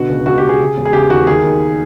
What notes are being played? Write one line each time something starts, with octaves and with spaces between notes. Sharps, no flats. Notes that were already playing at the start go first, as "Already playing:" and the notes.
Already playing: B2 D3 F#4
C#2
C#2 F#4
G4
C#2
G#4
C#3
E1
G#4
C#3 G4
D#2 F#4
D#2 G#4
D#3